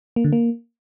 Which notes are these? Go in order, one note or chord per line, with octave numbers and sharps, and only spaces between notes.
A#3
D3
A#3